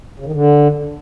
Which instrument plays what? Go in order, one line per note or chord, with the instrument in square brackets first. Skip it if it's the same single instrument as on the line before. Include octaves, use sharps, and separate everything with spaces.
[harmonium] C#3
D#3
D3